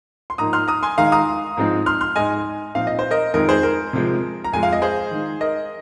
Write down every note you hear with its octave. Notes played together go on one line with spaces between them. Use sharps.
C6
G#2 F3 A#3 D#4 A#5 D#6
C6 F6
A#5 D#6
G#5 C6
D#3 G#3 D#4 F5 A#5
A#5 D#6
G#2 F3 G#3 C4 D#4
C6 F6
C6 F6
G#2 G#3 D#4 D#5 G#5
A#2 F3 C4 D#4 F5
D#5
C5
A#4 D#5
F2 D#3 G#3 D#4 A#4 D#5
G#4 C5
A#4
C3 F3 G#3
A#5
F2 F3 G#3 G#5
F5
D#5
G#4 C5
D#3 G#3 D#4
A#4 D#5